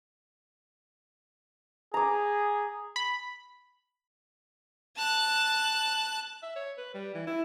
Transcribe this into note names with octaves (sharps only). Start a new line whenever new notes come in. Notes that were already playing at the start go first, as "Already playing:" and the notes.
G#4 A#5 D6
B5
A5 F#6
E5
C#5
B4
G3
E3
E4